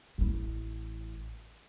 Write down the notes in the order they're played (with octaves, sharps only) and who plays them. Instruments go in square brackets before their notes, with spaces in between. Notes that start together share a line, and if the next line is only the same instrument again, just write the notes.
[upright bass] A1 E4